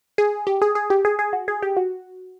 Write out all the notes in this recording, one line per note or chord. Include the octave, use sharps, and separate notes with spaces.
G#4
G4
G#4
G#4
G4
G#4
G#4
F#4
G#4
G4
F#4